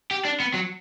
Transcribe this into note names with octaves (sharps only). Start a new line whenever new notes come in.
G4
D4
B3
F#3